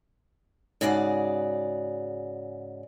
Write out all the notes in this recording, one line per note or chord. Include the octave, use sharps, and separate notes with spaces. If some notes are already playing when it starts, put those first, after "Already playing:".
G#2 C#3 F#4 G#4 D5